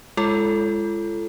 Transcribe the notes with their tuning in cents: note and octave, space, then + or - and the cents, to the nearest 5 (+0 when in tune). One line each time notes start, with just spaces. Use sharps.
G#3 -5 F4 -45 A4 +0